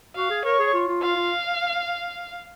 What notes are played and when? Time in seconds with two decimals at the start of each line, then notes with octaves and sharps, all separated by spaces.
0.15 F#4 F5
0.30 G#4
0.45 A#4 C#5
0.59 G#4
0.73 F4
0.88 F4
1.03 F4 F5
1.16 F4